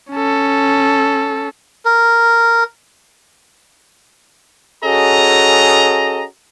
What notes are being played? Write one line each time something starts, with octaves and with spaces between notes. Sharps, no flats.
C#4 A4
A#4
C#4 F#4 G#4 A4 D#5 A#5